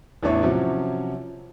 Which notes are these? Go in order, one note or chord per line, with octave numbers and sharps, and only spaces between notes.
A1 E2 E3 D4 E4 C#5
C3 F3 F#3 C#4